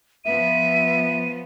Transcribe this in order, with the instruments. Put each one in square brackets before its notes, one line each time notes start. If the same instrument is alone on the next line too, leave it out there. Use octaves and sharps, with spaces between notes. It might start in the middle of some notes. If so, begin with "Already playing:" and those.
[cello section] F3 B3 [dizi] E5 [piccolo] D#7